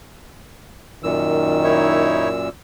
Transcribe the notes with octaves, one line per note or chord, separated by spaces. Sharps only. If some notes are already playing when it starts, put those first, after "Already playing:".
F#2 A#2 D#3 E6
D#4 E4 C#5